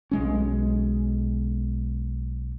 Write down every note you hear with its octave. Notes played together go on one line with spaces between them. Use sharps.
B1 G#3 C#4